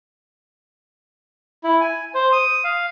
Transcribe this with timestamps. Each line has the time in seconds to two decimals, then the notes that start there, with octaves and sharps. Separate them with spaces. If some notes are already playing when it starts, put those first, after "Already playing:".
1.64 E4
1.80 G#5
2.14 C5
2.32 D#6
2.64 F5